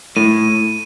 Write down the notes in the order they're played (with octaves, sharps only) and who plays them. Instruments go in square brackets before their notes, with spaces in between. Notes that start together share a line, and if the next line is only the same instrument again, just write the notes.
[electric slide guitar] A2 [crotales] D#7